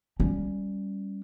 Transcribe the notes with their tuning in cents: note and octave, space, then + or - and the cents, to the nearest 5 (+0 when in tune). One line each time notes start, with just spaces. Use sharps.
G3 +0 C#4 +0